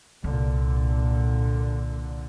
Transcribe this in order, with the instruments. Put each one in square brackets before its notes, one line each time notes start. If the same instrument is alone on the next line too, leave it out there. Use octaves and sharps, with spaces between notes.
[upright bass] C2 [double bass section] A#2 D3